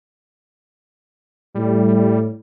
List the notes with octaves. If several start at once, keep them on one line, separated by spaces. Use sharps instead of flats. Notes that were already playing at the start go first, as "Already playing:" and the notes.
A2 G3